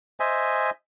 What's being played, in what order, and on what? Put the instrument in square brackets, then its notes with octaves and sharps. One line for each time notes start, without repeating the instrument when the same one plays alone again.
[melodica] C5 D#5 E5 G#5